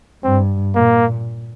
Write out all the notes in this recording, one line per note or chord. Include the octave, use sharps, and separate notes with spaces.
G2 C4
A#2 A#3